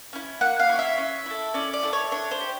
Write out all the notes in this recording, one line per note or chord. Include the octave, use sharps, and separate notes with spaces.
C#4 E4
A#3 F#5
F5
C#4 E4
E5
C#4
E4 A4
C#4 D5
D5
E4 A4
C#5
D4 C#5
C5
G4